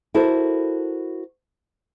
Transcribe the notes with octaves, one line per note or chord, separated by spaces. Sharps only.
E4 F#4 A4 A#4 C5